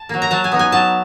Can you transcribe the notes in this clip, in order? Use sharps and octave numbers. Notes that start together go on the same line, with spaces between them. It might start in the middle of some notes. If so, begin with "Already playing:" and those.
Already playing: A5
F#3 A#3
A#5
F#3 A5
G#5
B3 D#4
G#5
F#3 A5